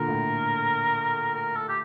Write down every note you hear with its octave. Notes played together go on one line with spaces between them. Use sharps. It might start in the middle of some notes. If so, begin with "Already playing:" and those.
Already playing: A#2 D3 A#4
A2
A#4
A4
G4